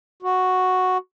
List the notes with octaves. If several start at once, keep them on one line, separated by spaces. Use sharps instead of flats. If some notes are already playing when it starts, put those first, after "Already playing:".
F#4